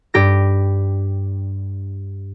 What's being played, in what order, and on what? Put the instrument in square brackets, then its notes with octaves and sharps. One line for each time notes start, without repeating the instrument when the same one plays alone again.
[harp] G2 G4 A#6